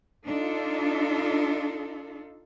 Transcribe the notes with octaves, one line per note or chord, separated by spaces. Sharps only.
D4 D#4 F4 A4